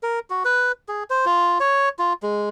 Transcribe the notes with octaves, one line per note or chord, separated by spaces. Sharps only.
A#4
F#4
B4
G#4
C5
F4
C#5
F4
G#3